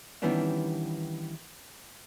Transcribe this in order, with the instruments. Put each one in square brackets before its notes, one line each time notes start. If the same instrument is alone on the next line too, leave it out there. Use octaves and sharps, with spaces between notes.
[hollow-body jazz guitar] D#3 E3 G3 B3 C#4 D4